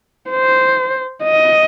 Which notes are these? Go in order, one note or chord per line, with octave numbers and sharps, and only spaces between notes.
C5
D#5